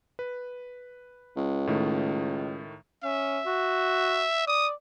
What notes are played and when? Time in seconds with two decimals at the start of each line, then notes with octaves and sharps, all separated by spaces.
0.19 B4
1.37 C#2
1.67 A2 D#3 A3
3.04 C#4 E5
3.46 F#4
4.47 D5 D#6